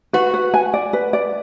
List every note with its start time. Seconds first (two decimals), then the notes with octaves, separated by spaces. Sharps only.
0.13 F#4 B4
0.34 B4
0.54 G#5
0.74 D5
0.93 B4
1.13 D5